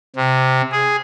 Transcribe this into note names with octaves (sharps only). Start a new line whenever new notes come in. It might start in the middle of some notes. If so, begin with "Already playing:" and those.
C3
G#4